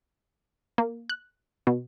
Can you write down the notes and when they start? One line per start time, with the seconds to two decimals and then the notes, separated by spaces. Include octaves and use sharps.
0.78 A#3
1.09 F#6
1.67 B2